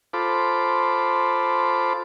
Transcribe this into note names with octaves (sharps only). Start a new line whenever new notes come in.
F4 A4 C5 B5 D6